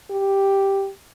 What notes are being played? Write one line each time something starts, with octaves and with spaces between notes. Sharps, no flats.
G4